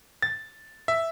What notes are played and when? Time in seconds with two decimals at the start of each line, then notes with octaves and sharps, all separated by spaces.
0.22 A6
0.88 E5